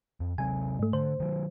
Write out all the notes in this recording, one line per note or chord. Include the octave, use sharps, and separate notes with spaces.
F2
C3 F#3 C4 G#5
G#2 A3
D3 C5
D#3 F#3